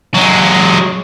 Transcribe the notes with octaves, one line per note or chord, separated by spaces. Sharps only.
F#3 G#3